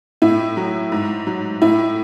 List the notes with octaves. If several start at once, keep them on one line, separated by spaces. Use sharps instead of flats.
A2 E4
F#3
G#2
F#3
A2 E4